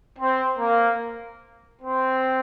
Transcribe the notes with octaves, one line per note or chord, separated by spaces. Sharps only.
C4
A#3
C4